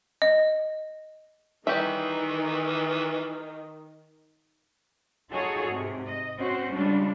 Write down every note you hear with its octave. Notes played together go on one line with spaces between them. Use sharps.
D#5
D#3 E3 G3 D#4 G4 E5
D#4 F4 F#4 G#4 A4 C#5
G#2 C3
D#5
C4 C#4 F#4 C5
C#3 G3 G#3 D4 F4